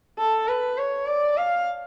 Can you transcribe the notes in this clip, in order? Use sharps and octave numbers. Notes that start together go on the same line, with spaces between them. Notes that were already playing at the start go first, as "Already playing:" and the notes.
A4
B4
C#5
D5
F5